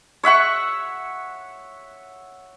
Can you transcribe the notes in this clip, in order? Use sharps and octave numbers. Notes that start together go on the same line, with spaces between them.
C#5 E5 F#5 C#6